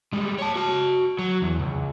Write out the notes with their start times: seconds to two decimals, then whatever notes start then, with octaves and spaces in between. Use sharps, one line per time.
0.13 G3 G#3
0.39 C#5 A5
0.56 F#4 A5
1.19 F#3
1.42 E2
1.60 C#2